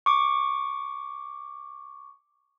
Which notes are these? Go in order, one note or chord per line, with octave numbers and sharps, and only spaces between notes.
C#6 D6